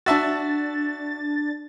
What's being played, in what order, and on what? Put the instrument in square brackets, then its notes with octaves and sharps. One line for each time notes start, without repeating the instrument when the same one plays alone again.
[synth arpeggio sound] D4 A6 [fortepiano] F#4 E5 A5